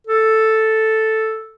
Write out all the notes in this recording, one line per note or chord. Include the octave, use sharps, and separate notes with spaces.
A4